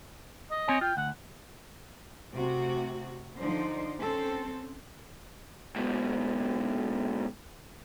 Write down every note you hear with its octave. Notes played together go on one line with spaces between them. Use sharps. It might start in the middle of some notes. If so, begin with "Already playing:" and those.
D#5
C4 C#5 G#5
F4 G5
D2 F#5
C3 A3 F#4
D3 F3 D#4 C5 D5
C4 C#4 A4
G#2 B2